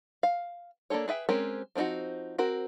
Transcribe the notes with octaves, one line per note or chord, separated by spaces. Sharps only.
F5
A#3 D4 F4 A4 C#5
G#4 B4 E5 G5
G#3 C4 C#4 G4 A#4
F3 C4 C#4 D#4 F#4
C4 F#4 A#4